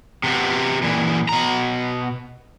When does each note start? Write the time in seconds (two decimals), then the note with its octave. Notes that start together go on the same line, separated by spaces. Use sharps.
0.24 C3 B3
0.83 A#2 E3
1.29 B2 A#5